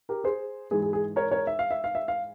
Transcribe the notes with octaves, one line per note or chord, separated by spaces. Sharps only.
G4 A#4
G#4 C5
G#2 E3 G#3 G#4
G#4
G#4
A#4 C#5
A#4 C#5
E5
F5
E5
F5
E5
F5